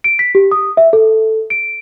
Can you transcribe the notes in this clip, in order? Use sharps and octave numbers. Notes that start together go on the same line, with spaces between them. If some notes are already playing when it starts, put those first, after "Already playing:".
D7
B6
G4
D#6
E5
A4
D7